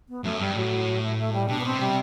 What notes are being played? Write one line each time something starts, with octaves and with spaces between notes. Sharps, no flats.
B3
F#2 A3
G2 G3
A2 F#3
A3
A3
G3
B2 D4
B3
C4
C3
G3